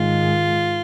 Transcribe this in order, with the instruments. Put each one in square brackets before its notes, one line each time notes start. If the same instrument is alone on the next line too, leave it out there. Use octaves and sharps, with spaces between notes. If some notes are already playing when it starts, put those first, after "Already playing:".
Already playing: [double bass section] G#2 D#3 G#3 [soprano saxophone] F4